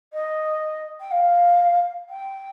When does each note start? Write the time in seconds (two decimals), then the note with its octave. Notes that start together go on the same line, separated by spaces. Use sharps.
0.13 D#5
1.00 G5
1.11 F5
2.09 G5